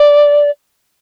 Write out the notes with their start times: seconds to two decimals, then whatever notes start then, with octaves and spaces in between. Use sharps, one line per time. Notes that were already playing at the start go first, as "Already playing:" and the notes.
Already playing: D5